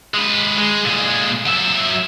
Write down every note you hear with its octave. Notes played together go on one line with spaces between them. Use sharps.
G#3 B4
G#3
A#2 G#3
F#3 E5